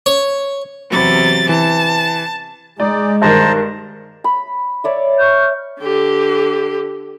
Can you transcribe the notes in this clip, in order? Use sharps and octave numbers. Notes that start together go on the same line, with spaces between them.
C#5
E2 C3 F#3 B5 A6
E3 A5
G#3 D#4 D5
G2 D#3 C5 A5 A#5
B5
C#5 D5 E5
C#6 F6 G6
D3 G4